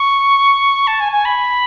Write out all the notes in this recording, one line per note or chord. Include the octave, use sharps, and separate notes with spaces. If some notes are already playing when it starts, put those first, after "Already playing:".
Already playing: C#6
A5
G#5
G#5
B5